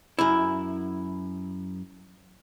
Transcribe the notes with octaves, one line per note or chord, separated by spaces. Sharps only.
F#2 E4